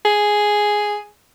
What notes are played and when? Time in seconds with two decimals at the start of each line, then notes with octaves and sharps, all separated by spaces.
0.05 G#4